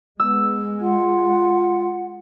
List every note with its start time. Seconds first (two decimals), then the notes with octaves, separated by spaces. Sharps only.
0.20 G#3 B3 E6
0.81 F4 F#5